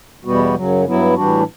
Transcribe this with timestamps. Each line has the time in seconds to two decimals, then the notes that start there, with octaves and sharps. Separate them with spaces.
0.25 E2 B2 G3 B3 F#4
0.54 F#2 C#3 F#3
0.85 G2 F#3 B3 E4
1.14 A2 E3 G3 D4 F#4